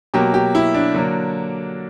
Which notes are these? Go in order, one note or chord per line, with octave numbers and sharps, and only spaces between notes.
B2 F#3 A#3 G4
G4
E4
D4
D3 F#3 A#3